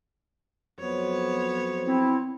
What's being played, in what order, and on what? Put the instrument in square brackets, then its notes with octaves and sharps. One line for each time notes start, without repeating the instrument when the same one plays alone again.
[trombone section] F2 F#3 C5 [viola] B3 C#5
[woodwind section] C4 E4